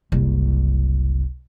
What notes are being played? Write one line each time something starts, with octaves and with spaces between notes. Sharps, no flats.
F#1 C2